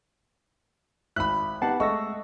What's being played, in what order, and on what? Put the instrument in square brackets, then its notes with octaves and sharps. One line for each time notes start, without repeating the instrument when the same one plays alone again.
[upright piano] G#1 [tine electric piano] E5 [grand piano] B5 F#6
[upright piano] B3 [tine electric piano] D#4 G4 [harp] F#5 A5 C7
[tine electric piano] G#3 E6 A#6 [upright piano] A3 E5 [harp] D#5 [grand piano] C#6